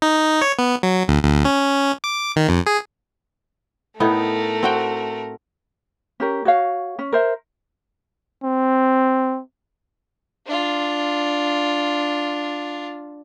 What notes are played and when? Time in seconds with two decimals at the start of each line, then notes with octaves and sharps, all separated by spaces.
0.02 D#4
0.41 C#5
0.59 B3
0.83 F#3
1.08 D2
1.24 D2
1.45 C#4
2.04 D6
2.36 D#3
2.49 F2
2.66 G#4
4.00 A2 A3 B3 D#4 A#4
4.63 C4 F#4 G5
6.20 C#4 G4 A#4
6.45 F#4 C#5 F5
6.99 C#4
7.12 A#4 C5 E5
8.43 C4
10.47 D4 F4